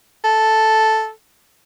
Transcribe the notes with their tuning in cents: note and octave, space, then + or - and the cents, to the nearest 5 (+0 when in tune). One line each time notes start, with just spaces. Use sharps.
A4 -5